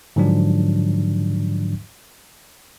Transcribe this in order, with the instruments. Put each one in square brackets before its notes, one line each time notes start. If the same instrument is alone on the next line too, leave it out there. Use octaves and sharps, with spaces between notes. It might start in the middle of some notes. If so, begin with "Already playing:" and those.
[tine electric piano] G#2 D3 F3 F#3 D4